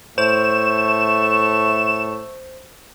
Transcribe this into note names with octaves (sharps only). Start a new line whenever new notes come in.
A2 A3 C5 C#6 E7